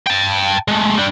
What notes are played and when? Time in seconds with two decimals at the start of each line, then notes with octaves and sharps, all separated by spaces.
0.07 G5 A5
0.68 G#3 A3
0.97 G3 D4